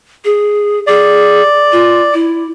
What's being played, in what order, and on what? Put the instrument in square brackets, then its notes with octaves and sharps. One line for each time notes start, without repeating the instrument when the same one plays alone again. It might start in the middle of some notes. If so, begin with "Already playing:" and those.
[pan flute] G#4
[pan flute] G#4 [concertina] D5
[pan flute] F4
E4